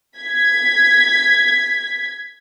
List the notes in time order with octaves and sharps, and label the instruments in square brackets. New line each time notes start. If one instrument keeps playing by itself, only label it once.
[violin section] G#6 B6